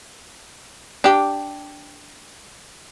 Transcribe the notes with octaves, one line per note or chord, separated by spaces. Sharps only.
D4 G4